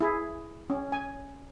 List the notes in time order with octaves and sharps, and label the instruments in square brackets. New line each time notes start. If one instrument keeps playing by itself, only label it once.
[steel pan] E4 G#4
C#4
G#5